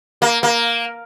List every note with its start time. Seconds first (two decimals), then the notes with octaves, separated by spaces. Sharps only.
0.22 A#3
0.43 A#3